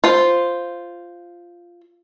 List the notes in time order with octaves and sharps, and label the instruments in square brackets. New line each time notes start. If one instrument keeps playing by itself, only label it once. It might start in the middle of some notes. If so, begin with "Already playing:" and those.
[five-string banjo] F4 C5